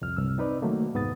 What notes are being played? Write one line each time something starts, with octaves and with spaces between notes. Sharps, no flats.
C2 F2 F6
C2 G2 E6
C4 D#4 B4 D5
D#3 F#3 A3 A#3
C2 F2 G#2 B3 D#6 A6